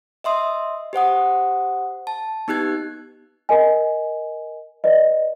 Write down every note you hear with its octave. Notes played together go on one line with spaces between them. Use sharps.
D#5 E5 C6 D#6
G4 C5 F#5 D#6
A5
B3 D#4 G4 F#6 G#6
A#4 D#5 G#5
B4 D5 D#5